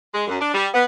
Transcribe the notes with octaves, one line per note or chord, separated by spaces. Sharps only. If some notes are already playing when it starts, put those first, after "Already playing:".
G#3
F#2
D4
G3
B3